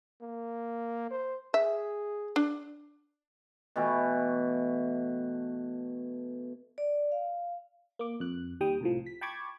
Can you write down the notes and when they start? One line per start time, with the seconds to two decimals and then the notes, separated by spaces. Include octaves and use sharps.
0.21 A#3
1.11 C5
1.54 G#4 E5
2.36 D4
3.76 B2 E3 A3 G5
6.78 D5
7.12 F5
7.99 A#3 D6
8.20 F2 F#6
8.61 D#2 G3 G5 D#6
8.81 C2 A2 F3
9.06 B6
9.21 G5 A5 B5 C#6 D6 G#6